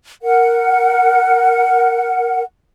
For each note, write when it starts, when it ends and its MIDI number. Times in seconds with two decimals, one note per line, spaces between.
0.22 2.42 70
0.22 2.42 78